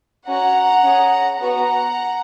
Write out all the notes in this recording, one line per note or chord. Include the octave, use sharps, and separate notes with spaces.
C#4 F#4 F#5 A#5
C#4 G#4
B3 F#4 F#5 A#5